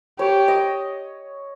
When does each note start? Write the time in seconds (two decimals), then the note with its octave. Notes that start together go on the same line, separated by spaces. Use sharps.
0.19 G4 C#5
0.48 D#5